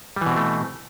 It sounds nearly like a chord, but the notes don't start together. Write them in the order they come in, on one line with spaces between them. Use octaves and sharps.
G3 E3 B2 C4 A3